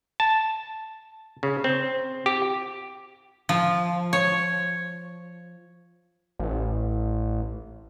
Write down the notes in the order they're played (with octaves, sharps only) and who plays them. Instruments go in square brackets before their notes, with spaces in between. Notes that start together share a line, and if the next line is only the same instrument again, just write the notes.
[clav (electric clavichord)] A5
C#3
C4
G4
[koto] F3
C#5
[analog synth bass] A1